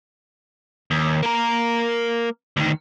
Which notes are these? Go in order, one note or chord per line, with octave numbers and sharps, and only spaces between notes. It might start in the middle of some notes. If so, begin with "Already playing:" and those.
D#2
A#3 A#4
D2 D#3